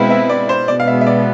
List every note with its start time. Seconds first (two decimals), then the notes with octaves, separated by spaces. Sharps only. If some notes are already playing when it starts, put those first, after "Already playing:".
Already playing: B2 G#3 C4 E4 B4 F5
0.10 E5
0.29 D5
0.49 C5
0.67 B2 G#3 B3 D5
0.80 F5
0.87 E5
1.01 E5
1.06 D5